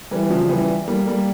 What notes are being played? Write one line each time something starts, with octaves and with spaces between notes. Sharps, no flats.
E3 G3
C#3 F3
E3 G3
G3 A#3
G3 A#3